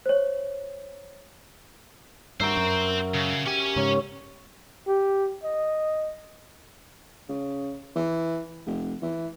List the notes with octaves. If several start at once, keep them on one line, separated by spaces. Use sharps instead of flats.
C5 C#5
G2 F#4 A#4 C5 E5 G5
F#2
C#3
C#4 G4 G#5
G#2 C#3 C#5
G4
D#5
C#3
E3
F1
E3